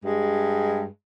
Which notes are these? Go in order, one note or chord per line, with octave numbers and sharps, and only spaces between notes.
G2 G#3